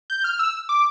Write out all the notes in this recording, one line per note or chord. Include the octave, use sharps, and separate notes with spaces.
G6
F6
E6
D6